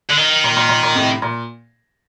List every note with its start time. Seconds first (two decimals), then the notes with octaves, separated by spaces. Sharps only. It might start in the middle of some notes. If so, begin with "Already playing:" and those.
0.10 D3
0.17 D#3
0.44 A#2
0.57 A#2
0.69 A#2
0.83 A#2
0.95 A2 C3
1.22 A#2